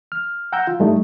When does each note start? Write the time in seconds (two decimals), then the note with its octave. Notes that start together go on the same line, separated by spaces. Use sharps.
0.12 F6
0.52 F#5 G5 A#5 E6 G6
0.67 F4
0.79 G2 G3 A3 D#4